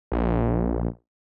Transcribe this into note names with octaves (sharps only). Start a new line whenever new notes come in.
A#1